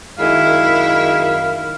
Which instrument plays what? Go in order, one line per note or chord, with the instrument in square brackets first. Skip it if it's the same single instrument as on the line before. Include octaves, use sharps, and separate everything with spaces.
[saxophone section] F#2 D#3 G#3 [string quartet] E4 [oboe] F5